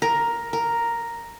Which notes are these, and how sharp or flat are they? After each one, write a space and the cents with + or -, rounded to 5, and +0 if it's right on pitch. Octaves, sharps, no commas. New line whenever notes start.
A#4 +5
A#4 +0